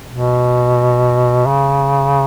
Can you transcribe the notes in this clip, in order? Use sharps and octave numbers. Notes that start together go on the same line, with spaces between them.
B2
C#3